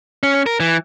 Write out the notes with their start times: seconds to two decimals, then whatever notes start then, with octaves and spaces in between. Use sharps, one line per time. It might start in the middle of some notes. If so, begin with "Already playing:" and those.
0.23 C#4
0.46 A#4
0.60 E3